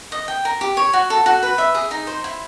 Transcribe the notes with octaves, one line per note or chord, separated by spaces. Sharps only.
D#5
G5
A#4
G4
C#5
F#4
A4
F#4
B4
E5
G#4
D#4
C5
E4